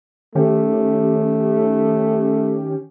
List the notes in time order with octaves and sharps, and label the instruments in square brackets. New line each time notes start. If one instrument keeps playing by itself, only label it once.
[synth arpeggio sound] D#3 C#4 G4 [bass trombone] A3